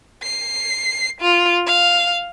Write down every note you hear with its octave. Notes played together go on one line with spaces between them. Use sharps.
C7
F4
F5